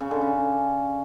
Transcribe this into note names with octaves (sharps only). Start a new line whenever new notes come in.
C#3
D3
C#3